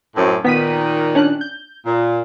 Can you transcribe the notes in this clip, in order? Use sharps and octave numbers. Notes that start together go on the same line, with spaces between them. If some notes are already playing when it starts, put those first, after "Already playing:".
F#2 A2 C4
A#2 D#3 B3 B6 D#7
C#4 D4 F#6
G6
A#2